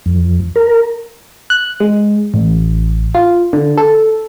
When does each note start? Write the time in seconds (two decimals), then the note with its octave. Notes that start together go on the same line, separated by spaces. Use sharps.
0.06 F2
0.56 A#4
1.50 F#6
1.80 G#3
2.34 A1
3.14 F4
3.53 D3
3.78 A4